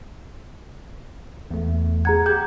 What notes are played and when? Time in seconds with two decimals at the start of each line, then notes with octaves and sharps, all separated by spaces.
1.51 E2 A3
2.05 G#4 F#5 A#5 G#6
2.26 G4 G6